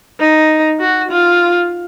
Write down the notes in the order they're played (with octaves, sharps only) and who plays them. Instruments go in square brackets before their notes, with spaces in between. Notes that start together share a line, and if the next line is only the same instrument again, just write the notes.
[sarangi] D#4
F#4
F4